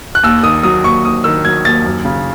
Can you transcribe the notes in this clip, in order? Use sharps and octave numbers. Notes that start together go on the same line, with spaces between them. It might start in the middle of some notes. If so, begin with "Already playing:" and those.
F#6
D#2 E6
D#3 D#6
F#3 D#6
D#2 C#6
D#2 D#6
D#3 E6
F#3 G#6
D#2 A6
F#2
C#3